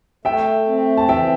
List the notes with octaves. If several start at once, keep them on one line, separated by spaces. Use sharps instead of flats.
A3 E5 G5
C4
A5
E3 E5 G5